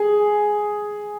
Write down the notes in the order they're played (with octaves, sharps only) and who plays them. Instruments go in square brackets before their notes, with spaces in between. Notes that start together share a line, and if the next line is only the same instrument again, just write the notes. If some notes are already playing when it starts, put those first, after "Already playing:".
Already playing: [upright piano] G#4